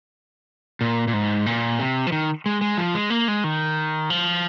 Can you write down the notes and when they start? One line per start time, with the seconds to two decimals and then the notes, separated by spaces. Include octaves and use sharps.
0.81 A#2
1.08 A#2
1.13 G#2
1.46 A#2
1.79 C3
2.07 F3
2.12 D#3
2.46 G#3
2.61 G#3
2.78 F3
2.94 G#3
3.10 A#3
3.28 G#3
3.44 D#3
4.10 F3